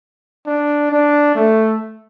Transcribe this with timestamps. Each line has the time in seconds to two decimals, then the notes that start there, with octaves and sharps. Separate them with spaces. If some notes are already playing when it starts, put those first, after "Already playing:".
0.47 D4
0.91 D4
1.35 A3